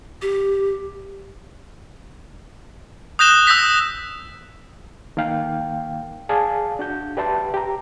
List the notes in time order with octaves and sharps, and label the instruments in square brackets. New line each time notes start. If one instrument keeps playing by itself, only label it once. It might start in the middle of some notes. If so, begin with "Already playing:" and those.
[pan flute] G4
[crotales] D#6 F#6 G6 A#6 E7 G7
D#6 E6 G6 A#6 B6
[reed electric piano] D#3 A#3 F5 G5
G#4 D5 F5 A5
D4 F#4 G6
G4 B4 D5 E5 A5 C6
G4 A#5